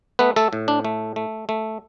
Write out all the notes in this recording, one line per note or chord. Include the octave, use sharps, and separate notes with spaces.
A3 B3 B4
A3 A4
A2
D4
A3
A3
A3